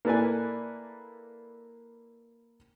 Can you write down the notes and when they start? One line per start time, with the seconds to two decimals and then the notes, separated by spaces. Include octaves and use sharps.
0.05 A#3 E4 A4 B4 D5 G#5